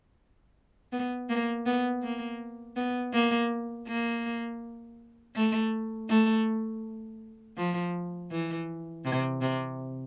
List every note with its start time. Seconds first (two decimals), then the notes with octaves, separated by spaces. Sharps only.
0.92 B3
1.29 A#3
1.66 B3
2.02 A#3
2.76 B3
3.13 A#3
3.87 A#3
5.35 A3
6.09 A3
7.57 F3
8.31 E3
9.05 C3
9.41 C3